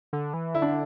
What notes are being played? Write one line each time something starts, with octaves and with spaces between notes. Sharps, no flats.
D3
E3
D3 E4
D4